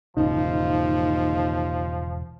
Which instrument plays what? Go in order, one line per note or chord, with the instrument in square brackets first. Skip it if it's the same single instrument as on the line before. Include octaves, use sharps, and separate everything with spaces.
[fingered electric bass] E1 G#2 C#3 [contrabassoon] D#2 [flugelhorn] F3 [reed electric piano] D#4